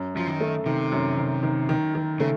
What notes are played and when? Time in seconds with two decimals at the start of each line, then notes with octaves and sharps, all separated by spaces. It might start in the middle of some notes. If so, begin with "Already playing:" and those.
Already playing: F#2
0.15 F#2 F3
0.27 D#3
0.40 A3
0.66 C3 D#3
0.92 F#2
1.17 D#3
1.43 D#3
1.69 D#3
1.95 D#3
2.20 C#3 A3